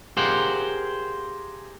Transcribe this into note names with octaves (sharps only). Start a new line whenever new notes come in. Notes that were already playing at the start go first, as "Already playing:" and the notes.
G4 G#4 A#4 C5 F5 F#5